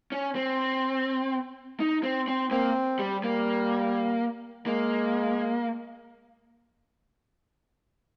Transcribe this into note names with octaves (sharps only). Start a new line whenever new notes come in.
C#4
C4
D#4
C4
C4
A#3 C4
G3
G3 A#3
G#3 A#3